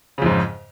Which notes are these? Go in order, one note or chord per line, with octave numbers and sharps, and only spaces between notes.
F2 G#2 C#3